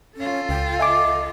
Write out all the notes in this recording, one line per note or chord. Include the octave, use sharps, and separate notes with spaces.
C#4 F4 A4
C#2 G5
D#5 E5 G#5 D6